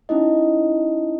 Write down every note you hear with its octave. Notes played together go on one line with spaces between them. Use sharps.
C#4 D#4 E4 D#5